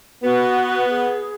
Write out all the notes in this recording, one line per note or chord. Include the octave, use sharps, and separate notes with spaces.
B3 F#4
G#4